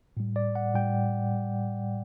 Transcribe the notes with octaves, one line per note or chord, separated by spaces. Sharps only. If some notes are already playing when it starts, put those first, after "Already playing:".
A2 G3
D5
F#5
A2 G3 G5
A2 G3